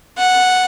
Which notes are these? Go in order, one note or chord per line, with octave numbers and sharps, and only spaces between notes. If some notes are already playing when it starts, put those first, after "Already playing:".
F#5